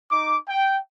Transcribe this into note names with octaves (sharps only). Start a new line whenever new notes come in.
D#4 D6
G5